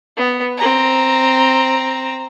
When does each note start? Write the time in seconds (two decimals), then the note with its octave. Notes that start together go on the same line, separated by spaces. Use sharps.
0.17 B3
0.57 C4 A#5